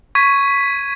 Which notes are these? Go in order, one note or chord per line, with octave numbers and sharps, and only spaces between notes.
C#6 G#6 B6 D#7